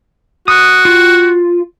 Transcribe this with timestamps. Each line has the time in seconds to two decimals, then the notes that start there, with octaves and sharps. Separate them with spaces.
0.48 F#4 D#6
0.85 F4